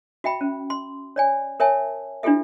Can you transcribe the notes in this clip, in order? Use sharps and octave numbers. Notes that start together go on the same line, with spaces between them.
F#4 E5 G5 B5
C#4
C6
C#5 D5 G#5
A#4 C#5 E5 G#5 A5
D4 E4 F4 G4 A4 E5